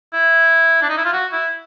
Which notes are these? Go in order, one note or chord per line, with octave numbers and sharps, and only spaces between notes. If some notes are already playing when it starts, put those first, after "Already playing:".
E4
D4
D#4
E4
F4
F#4
E4